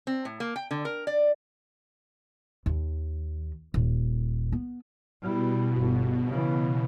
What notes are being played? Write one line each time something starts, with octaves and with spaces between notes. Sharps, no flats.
C4
A2
A#3
G5
D3
A#4
D5
D#2
D#1
B3
B2 G3 E4
G1
C#3 E3